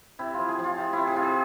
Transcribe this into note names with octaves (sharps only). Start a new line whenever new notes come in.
C3 E4
F3 F4
G#4
F3
F4
C3
E4
C3
G#4
C3 F4
G#4